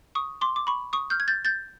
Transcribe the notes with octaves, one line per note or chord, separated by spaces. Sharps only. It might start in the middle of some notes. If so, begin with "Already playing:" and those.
C#6 D#6
C6 D6
D6
B5 C#6
C#6 D#6
F6 G6
G#6
G6 A6
G6 A6